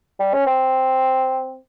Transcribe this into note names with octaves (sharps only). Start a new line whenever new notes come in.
G3
C#4
C4